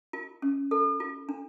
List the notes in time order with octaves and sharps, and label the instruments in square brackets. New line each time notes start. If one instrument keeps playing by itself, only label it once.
[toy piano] F4
C#4
A4
F4
D4